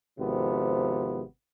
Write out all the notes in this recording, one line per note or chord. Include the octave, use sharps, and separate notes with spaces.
G#1 C3 F3 B3